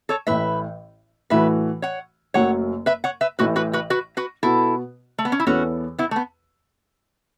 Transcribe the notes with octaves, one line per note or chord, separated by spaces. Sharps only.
A4 C#5
A1 A2 E3 A3 B4 E5
A2 E3 A3 F#4 A4 B4 E5
C#5 F#5
F#1 F#2 F#3 A3 C#5 F#5
B4 E5
C#5 F#5
B4 E5
A1 A2 E3 A3 F#4 B4
F#4 B4
F#4 B4
F#4 B4
F#4 B4
B2 B3 E4 F#4 A4
A3
B3
C#4
E4
E2 E3 B3 C#4 F#4 A4 C#5
B3 E4
A3
B3